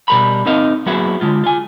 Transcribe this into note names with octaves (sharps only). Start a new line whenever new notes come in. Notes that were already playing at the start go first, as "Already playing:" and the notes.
B2 G3 A#4 A#5 B5
C4 D#4 A#4 D#5 F5
F#3 A#3 B3 E4 F#4 G#4
D3 G#3 F4
F4 G#5